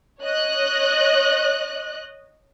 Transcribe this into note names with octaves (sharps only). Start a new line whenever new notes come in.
C#5 D#5 F#6